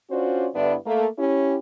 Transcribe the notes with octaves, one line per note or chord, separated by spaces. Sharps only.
C#4 D4 F4 F#4 C5 D5
G2 D3 B3 D4 E4
A3 A#3
C#4 E4 G4